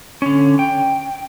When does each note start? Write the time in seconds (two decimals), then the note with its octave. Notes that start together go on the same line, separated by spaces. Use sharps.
0.22 D3 C#4
0.59 G5